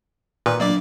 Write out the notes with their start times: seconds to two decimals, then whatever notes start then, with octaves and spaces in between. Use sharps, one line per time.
0.46 A#2 D#3 B4 D5
0.60 F#3 A#3 D4 D5 D6